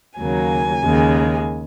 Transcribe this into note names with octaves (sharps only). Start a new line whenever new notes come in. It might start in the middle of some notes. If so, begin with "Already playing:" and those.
D#2 C#3 F#3 A#3 G#5
D#2 C#3 G#3